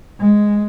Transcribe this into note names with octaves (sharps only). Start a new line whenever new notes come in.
G#3